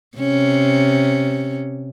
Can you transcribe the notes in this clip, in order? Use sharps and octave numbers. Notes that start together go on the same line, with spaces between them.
C3 C#4